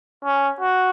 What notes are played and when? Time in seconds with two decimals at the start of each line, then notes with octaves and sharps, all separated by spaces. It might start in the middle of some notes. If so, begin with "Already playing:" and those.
0.24 C#4
0.60 F#4